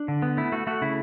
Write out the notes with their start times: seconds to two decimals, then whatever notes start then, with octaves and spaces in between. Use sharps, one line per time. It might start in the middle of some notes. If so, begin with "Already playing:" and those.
Already playing: D4
0.08 D3
0.22 B3
0.37 A3 E4
0.52 A3 F#4
0.67 A3 F#4
0.82 C#3 E4